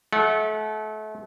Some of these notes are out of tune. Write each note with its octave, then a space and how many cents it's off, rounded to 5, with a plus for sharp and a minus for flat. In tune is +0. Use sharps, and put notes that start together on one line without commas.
A3 -35 F#5 -15